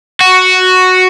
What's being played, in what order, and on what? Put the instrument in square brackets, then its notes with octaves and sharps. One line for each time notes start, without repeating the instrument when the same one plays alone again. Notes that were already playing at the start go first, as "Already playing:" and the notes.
[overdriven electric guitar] F#4